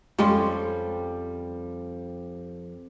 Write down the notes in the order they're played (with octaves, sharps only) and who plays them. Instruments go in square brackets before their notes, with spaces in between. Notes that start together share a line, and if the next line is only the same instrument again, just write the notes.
[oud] F2 [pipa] F3 C#4 C6 [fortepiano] G3 [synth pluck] G#3 G4 C#6